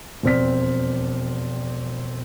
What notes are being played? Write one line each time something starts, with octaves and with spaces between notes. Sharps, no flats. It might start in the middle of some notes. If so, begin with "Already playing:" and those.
E1 F2 C4 D5 F6 B6